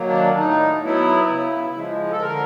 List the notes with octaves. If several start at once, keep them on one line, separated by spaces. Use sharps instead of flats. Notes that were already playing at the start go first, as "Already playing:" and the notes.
Already playing: D#3 F#3 A#3
D4
A2 D#4
F#3 B3 E4
C#3
F3 G#3
A4
D3 A#4